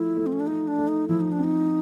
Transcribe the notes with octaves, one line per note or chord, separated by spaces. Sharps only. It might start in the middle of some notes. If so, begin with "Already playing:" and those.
Already playing: F3 A3 E4 F4
A3
C4
C#4
D4
A3 D#4
D4
A3
D#4
F3 E4
D#4
D4
C4
D#4